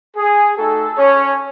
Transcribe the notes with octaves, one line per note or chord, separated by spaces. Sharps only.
G#4
A3 D#4 F#4 A4
C#4 C#5